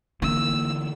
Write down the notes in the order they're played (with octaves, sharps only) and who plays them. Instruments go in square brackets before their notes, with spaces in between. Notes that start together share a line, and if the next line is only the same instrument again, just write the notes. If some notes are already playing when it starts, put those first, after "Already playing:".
[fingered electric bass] D3 E3 [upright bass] A#3 [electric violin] E6